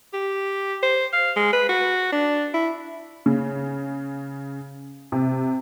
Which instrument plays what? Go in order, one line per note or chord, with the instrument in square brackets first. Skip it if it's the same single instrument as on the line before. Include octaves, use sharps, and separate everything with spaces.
[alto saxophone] G4
C5
F5
G#3
B4
F#4
D4
E4
[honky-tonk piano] C#3
C3